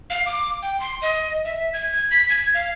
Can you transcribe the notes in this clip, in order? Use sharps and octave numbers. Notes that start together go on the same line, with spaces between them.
F5
D6
G5
C6
D#5
E5
G#6
B6
G#6
F5